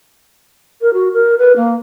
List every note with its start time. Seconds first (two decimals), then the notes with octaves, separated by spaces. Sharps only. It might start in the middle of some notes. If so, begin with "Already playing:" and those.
0.81 A#4
0.93 F#4
1.13 A#4
1.38 B4
1.56 A#3